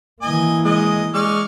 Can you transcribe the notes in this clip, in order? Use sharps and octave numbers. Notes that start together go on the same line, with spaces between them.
E3 A#3 D#5 G#5
G#3 D#5 G#5
G#3 D5 C#6 F6